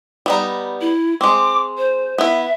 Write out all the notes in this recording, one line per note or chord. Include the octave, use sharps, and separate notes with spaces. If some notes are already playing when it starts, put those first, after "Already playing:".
G3 B3 D#4
E4
G#3 C4 D6
C5
B3 E4 E5